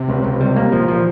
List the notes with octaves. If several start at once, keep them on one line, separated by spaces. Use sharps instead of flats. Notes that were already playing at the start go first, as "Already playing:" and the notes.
Already playing: C3
C#2
C#2
G3
A#3
A#2 F3
F3